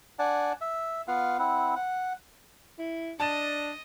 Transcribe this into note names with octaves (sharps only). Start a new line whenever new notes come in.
D4 D5 F#5 G#5 A5
E5
B3 F4 F5 F#5
C4 E4 F#5
F#5
E4
D4 D#5 A5 A6 E7